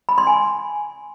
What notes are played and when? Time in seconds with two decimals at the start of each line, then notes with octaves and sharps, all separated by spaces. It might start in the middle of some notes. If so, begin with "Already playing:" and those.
0.09 B5
0.18 C6
0.27 G#5